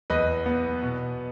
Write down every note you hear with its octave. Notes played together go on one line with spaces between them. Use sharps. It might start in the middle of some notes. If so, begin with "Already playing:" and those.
E2 B4 D#5
B3
B2